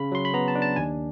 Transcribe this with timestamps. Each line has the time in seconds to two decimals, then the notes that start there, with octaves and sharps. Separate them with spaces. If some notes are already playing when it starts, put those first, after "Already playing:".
Already playing: C#3 B5
0.12 F#3 C6
0.25 B5
0.34 B3 A#5
0.48 A5
0.55 D4
0.62 A5
0.76 D#2 G#5